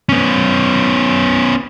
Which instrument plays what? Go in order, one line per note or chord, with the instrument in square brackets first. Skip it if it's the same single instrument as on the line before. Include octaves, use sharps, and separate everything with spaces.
[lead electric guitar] B3 C#4